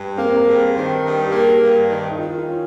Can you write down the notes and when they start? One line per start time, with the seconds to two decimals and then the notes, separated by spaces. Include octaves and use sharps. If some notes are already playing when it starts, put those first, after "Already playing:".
Already playing: G2
0.17 A#3 C4
0.36 A#4
0.47 G2 G#4
0.75 D#3 C5
1.04 G2 A#4
1.23 G4
1.32 A#3 G#4
1.42 G4
1.61 G2
1.90 D#3
2.11 D#4
2.19 D#3 F4
2.38 F4
2.47 C#4